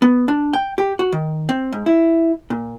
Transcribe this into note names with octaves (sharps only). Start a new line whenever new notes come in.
B3
D4
G5
G4
F#4
D#3
C4
G#2
E4
A#2